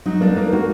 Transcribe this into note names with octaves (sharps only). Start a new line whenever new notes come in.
F#3 D#4
A#3 D4
A#3 D#4
A#3 F#4